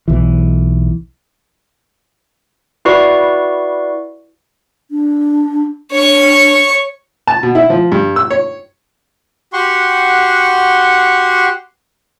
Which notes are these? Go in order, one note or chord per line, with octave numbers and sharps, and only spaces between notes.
B1 E3
E4 F#4 B4 D5 C#6 C7
D4
D4 C#5 C#6
A5
B2
E4
F3
G2
E6
C#5
F#4 G4 F#5 C6 C#6